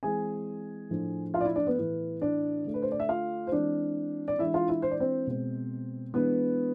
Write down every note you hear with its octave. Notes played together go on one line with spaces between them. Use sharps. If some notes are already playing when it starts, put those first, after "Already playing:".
E3 G#3 C4 G#4 G#5
A2 F3 A3 D4
F4 F5
D5
E4 E5
D4 D5
B3 B4
A2 E3 B3
D4 D5
D3 A3 D4
B4
C5
D5
E5
F4 F5
C5
E3 G#3 C4 D4 D5
D5
E3 G#3 D4 E4 E5
F4 F5
E4 E5
C5
D5
C4 C5
B2 G#3 C4
E3 G#3 B3 D4 B4